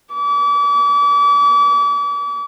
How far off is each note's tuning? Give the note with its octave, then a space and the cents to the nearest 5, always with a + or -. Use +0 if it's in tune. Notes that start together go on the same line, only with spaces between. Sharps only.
D6 -40